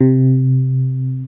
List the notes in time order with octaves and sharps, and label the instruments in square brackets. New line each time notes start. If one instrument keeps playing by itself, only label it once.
[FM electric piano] C3